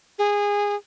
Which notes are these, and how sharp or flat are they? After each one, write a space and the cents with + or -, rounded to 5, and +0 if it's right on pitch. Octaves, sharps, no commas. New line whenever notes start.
G#4 -20